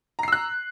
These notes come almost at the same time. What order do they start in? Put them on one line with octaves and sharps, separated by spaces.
A#5 C7 E6 F#6